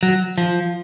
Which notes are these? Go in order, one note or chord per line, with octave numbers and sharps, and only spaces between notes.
F#3
F3